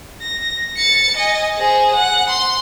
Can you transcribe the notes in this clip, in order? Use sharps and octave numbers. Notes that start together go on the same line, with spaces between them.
A#6
A6 C#7
D#5 G#5
G#4 C5
F#5
C6